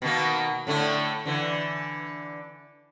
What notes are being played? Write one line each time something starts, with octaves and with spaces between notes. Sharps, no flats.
B2 D#3 A#3
A2 D3 A3
D3 E3